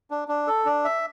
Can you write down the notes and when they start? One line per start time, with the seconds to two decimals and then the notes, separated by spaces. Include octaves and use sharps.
0.11 D4
0.28 D4
0.47 A4
0.66 D4
0.85 E5